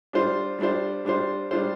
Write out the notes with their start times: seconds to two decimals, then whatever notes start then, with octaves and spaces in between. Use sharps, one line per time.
0.13 G3 D4 F4 C5
0.59 G3 D4 F4 C5
1.05 G3 D4 F4 C5
1.51 G3 D4 F4 C5